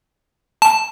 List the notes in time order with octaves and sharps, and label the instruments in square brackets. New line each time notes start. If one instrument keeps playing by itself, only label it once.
[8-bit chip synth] A5